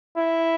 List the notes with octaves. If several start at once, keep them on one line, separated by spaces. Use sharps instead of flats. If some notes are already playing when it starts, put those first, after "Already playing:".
E4